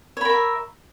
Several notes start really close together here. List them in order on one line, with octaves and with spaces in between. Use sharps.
C#5 B5 A#4 E5